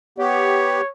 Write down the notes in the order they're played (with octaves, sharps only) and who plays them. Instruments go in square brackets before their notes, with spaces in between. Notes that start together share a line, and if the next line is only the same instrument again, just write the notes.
[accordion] B3 G4 [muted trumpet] C#5